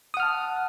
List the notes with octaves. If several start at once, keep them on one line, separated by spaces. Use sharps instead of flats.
F#5 A5 D#6 F6